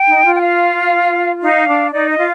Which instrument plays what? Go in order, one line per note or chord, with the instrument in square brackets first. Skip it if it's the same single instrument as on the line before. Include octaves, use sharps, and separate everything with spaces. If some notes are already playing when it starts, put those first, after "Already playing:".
Already playing: [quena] G5
[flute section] D#4
F4
[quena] G5
F5
[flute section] D#4 [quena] F5
[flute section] D4
[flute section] D#4 [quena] D5
[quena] D#5
[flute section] F4